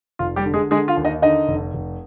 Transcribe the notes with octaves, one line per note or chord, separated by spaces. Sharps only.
F1 F4
G3 G4
D3
G#3 G#4
D3 G#3 G#4
F4 F5
D#2
D#4 D#5
D3 D#4 D#5
F1
F1